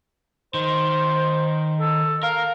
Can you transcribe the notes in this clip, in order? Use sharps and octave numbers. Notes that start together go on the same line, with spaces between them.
D#3 C5
A4
A#4 F5